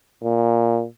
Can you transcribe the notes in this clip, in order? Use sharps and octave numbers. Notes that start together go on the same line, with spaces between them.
A#2